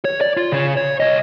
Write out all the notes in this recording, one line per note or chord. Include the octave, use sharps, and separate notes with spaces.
C#5
D5
F4
C#3 C#5
C#5
C2 D#5